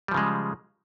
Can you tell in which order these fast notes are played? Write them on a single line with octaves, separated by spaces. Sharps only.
G3 F3 C#3 G#3